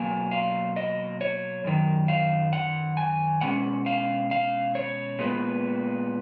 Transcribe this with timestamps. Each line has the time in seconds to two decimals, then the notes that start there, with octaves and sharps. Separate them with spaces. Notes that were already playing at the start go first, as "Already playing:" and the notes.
Already playing: B2 F#3 A#3 G#5
0.31 F5
0.76 D#5
1.21 C#5
1.64 F#2 D#3 F#3
2.08 F5
2.53 F#5
2.97 G#5
3.41 B2 G#3 C#4 F#5
3.86 F5
4.31 F5
4.75 C#5
5.19 A#2 G#3 B3